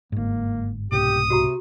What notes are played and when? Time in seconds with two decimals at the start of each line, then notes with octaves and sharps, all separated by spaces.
0.12 G1 G#2 A#3
0.92 C2 G#2 B2 G4 D#6
1.30 C3 F#4 G4 A#5